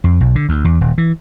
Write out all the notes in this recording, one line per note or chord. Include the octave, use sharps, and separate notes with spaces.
F2
B1
D3
D2
E2
D#1
E3